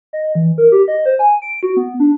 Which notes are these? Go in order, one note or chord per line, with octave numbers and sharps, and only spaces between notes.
D#5
E3
A#4
G4
D#5
C5
G#5
D7
F#4
B3
D4